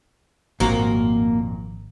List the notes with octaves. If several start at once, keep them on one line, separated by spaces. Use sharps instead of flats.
G#1 F2 A#2 A#3 F#4